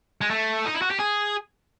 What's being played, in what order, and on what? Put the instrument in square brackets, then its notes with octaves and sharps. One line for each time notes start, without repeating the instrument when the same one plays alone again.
[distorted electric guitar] G#3
A3
D#4
E4
F#4
G4
G#4